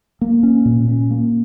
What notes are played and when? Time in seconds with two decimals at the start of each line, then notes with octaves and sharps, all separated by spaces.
0.21 A#3
0.43 C#4
0.65 A#2
0.88 C#4
1.11 A#3